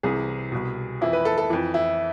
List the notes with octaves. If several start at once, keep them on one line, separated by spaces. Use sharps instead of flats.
C2 C3 E3 G#4
C2 B2
F2 E3 E4
B4
A4
A4
F2 E3
E4